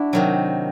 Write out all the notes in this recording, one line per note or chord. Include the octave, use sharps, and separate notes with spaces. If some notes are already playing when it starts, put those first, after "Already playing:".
Already playing: D4 E4 F#4
C3 D#3 F#3